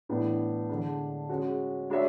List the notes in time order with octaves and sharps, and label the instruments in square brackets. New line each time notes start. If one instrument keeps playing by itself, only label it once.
[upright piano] A2 E3 B3 D4
D3 G#3 D4
G#3 C#4 F#4
G#3 D4 F#4 C#5 E5